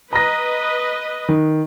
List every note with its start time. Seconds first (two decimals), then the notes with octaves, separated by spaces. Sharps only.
0.13 B4 D#5 A#5 A#6
1.29 D#3